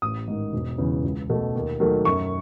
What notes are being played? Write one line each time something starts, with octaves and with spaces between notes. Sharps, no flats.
A1 D#6
G#2 D#3
E1
E2 C#3 E3
C#2
B2 A3
D#2
D#3 F#3 A3
F#2 C#6